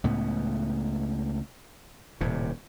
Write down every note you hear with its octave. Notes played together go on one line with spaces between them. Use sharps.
C#2 A2 B3
D#1 A2 C3